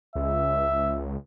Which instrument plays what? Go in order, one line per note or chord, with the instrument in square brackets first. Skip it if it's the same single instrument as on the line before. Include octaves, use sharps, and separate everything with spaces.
[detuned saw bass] C#2 [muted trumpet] E5